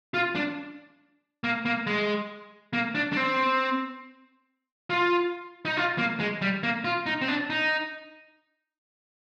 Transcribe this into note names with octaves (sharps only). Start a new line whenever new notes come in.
F4
D4
A#3
A#3
G#3
A#3
D4
D4
C4
F4
D#4
F4
A#3
G#3
G3
A#3
F4
D#4
C4
D4
D#4